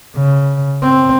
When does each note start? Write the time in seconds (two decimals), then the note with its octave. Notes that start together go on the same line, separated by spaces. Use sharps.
0.17 C#3
0.83 C4